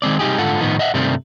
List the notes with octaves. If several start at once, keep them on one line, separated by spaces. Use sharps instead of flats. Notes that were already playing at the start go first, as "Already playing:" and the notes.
D#3 G#3 C4 D5
C3 G3 D#4 G4 G#4
G#2 D3 F4 A4 F#5
A2 D#3 F3 B3 D#4
D#5 E5 F#5
G2 C3 D#3 G3 A3 C4